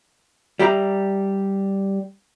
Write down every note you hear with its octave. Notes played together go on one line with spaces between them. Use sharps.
G3 G4 E5 A#5